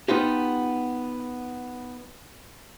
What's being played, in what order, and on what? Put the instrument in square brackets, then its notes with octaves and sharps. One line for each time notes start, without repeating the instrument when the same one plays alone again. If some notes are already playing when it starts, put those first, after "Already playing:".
[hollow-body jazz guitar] B3 D#4 F4 G4